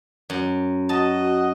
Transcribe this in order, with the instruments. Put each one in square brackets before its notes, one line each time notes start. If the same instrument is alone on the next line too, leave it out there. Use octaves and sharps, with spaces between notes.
[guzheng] F#2
[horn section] F#4 D#5 [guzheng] A5